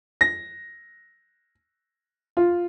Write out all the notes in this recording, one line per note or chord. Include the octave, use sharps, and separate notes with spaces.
A#6
F4